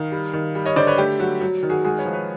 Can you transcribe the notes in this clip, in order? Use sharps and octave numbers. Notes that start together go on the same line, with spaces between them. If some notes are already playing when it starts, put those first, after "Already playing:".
Already playing: D#3 F5
G3
D#3
G3
C#5 D#5
D3 C5 D5
B4 C#5
A3 G4
F#3 F#4
F#3
D#3
F#4 G#4
G#3 F#4 G#4
B4 C#5
F3
B4 C#5